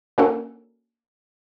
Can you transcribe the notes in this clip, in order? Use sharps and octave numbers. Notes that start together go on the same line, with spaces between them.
A#3 C#4 D4 F#4 A4 A#4